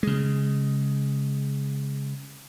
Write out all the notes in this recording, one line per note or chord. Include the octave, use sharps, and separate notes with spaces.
C#3 G#3